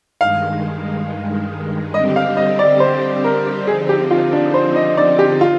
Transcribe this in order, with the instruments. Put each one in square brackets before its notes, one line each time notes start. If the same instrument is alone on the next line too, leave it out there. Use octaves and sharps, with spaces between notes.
[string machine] G2 D#3 G#3 [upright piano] F5
[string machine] D3 G3 C4 G4 [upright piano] D#5
[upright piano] F5
D#5
D5
C5
A#4
[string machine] D3 F3 C4 D#4 [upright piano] G#4
[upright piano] G4
F4
D4
C5
D#5
D5
G4
F4